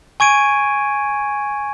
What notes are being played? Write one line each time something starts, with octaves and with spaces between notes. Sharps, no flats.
G#5 C#6 G#6 D7 D#7